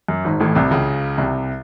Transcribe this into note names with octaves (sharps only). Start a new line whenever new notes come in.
F#2
G#1 G#2
A1 A2
C2 C3
C#2 C#3
C2 C3